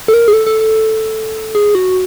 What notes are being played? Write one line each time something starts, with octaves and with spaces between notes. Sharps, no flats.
A4
A#4
G#4
A4
A4
A4
G#4
F#4